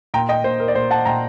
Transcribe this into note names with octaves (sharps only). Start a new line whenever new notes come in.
A#2 G5 A#5
D#5 G5
A#2 C5
A#4
D5
A#2 C5
F#5 A5
A#2 G5 A#5